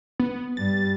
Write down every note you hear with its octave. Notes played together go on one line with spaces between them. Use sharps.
B3
G2 G3 A6